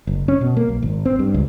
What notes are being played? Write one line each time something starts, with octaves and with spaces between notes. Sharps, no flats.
F#1
C#4
B2
A#3
B1
G#1
C4
G2
C#2